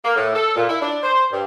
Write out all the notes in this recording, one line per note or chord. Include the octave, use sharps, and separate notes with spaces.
A#3
A2
A4
A#2
E4
D4
C5
G2